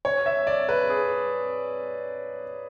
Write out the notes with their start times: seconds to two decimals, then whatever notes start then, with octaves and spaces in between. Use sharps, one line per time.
0.05 C#5
0.26 E5
0.47 D5
0.69 B4
0.89 G#4